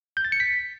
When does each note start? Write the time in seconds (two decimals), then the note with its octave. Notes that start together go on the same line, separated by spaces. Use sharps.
0.17 G6
0.25 A6
0.32 C#7
0.40 B6